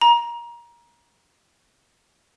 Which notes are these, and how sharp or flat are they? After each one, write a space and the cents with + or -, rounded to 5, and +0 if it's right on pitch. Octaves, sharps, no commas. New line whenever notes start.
A#5 +25